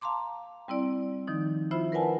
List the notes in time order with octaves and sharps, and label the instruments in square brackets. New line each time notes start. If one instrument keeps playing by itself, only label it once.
[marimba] F5 A5 A#5 C6 D6
G3 C4 E4 D5
D#3 F3 D#4
E4 F4 C5 E5 B5
A#4 B4 D5 F#5 G#5 A5